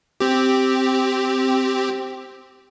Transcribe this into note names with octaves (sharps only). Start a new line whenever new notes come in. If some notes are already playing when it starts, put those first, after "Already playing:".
C4 G4